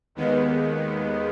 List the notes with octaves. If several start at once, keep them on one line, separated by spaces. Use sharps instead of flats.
D#2 D#3 G#3 B3